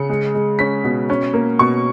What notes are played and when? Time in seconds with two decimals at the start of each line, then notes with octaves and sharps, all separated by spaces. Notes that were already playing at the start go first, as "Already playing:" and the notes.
Already playing: C#3 C#7
0.09 G#3
0.34 G#3
0.59 C#4 B6
0.84 B2
1.10 C#4
1.33 A#3
1.59 B2 C#6